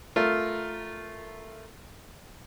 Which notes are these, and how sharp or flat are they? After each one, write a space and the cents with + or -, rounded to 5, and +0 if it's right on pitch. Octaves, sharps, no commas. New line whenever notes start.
A3 +0 F4 +0 A#4 +0